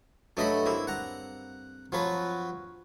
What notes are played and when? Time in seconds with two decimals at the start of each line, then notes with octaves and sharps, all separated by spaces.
0.37 G2 F#3 A3 D#5 B5
0.66 A#3 C4 E4 A4
0.87 F#5 A#5
1.92 F3 F#3 F4 B4